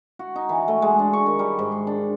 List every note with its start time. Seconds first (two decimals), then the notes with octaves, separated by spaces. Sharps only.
0.19 F#4
0.36 D#4
0.49 E3
0.68 A3
0.82 G#3
0.99 D4
1.13 C#6
1.26 D#3
1.39 G3
1.59 G#2
1.72 C6
1.87 D4